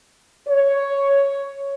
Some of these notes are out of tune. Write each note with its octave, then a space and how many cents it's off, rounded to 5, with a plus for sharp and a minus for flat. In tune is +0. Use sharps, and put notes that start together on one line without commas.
C#5 +5